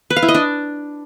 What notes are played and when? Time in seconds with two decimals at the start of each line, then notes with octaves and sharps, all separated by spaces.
0.10 B4
0.16 F5
0.22 E4
0.28 D#5
0.35 D4